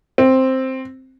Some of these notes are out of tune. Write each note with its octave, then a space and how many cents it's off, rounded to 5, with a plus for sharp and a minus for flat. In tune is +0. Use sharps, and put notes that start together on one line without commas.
C4 +5